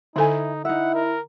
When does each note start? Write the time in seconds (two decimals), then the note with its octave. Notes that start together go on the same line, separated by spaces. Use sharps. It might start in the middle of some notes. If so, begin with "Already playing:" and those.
0.16 D3 D#4 E4 A4 G#5
0.65 D#4 E4 E5 F#5
0.94 A#4